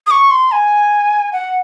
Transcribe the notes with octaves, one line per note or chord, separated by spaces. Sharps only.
D#6
C#6
C6
G#5
F#5